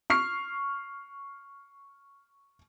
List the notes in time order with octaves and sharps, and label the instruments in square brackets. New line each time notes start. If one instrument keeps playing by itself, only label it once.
[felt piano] C#6 F6 C7